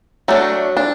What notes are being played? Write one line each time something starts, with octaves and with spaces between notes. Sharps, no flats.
F#3 A3 D4
D4